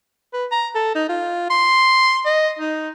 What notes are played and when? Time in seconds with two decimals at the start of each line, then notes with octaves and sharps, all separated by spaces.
0.33 B4
0.52 A#5
0.75 A4
0.95 D#4
1.09 F4
1.50 C6
2.25 D#5
2.59 D#4